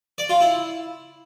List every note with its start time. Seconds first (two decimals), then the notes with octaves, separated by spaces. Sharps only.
0.18 D5
0.29 F4
0.41 E4